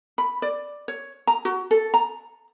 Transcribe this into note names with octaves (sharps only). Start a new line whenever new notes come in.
B5
D5
C#5
A#5
F#4
A4
A#5